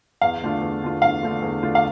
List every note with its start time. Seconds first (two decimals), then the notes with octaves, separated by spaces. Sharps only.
0.21 E2 F5
0.42 D3 A3 D4 F4
0.62 E2
0.82 D3 A3 D4 F4
1.02 E2 F5
1.23 D3 A3 D4 F4
1.42 E2
1.62 D3 A3 D4 F4
1.75 F5